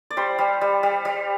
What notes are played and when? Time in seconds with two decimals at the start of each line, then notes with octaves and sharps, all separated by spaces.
0.10 D5
0.17 G3 C5
0.39 G3
0.61 G3
0.83 G3
1.05 G3